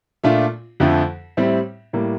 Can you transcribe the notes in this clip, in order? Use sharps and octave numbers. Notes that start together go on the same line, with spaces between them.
A#2 A3 D4 F4
F2 D3 F3 A3
A2 G3 C4 E4 G4
A2 G3 A#3